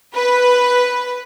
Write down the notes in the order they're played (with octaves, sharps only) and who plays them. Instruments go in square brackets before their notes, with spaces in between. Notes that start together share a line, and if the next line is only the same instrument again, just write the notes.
[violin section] B4